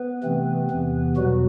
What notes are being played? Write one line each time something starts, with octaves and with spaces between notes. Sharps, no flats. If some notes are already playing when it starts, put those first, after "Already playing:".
Already playing: B3 B4
C3 E3 A3 C4
E2 C3 E3
E2 B2 F#3 G3 F#4